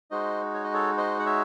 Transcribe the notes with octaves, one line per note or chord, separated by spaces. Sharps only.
G#3 D#4 F#4 C5 D#5
C#5
D#5
A4 C#5
C5 D#5
F#5
C#5 E5